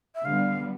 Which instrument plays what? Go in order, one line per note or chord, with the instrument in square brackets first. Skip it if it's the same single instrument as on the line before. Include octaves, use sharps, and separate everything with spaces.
[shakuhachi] E5
[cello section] D3 G3 B3 [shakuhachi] F5